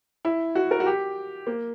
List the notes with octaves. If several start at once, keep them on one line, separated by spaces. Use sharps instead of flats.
E4
F#4
A#4
F#4
G4
A#3